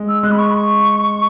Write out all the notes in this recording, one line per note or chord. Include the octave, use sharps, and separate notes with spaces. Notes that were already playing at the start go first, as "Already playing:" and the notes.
Already playing: G#3
E6
G#3 F#6
B5
C#6
B5
C#6